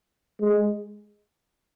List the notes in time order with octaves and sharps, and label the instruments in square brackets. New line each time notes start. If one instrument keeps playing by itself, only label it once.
[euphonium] G#3